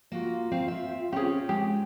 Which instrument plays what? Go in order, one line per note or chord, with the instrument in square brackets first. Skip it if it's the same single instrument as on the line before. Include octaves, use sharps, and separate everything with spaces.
[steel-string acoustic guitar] A#3 F#4 [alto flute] F4
[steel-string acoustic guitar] C4 F5
E5
[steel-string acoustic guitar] C4 C#4 [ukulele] G4 G#4
[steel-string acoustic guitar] G#3 [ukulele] G4